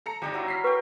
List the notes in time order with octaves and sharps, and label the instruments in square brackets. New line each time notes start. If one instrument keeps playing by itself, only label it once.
[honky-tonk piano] A4 A#5 C#7
[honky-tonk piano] G1 [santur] G3 D#4 G4
[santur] F#3 E4 A#5
[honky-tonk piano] F6 B6 C7
[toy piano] B4 [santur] G5 C#6